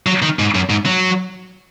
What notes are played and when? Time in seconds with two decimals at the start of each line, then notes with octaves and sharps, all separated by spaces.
0.07 F#3
0.22 D#3
0.39 G#2
0.55 F#2
0.70 G#2
0.86 F#3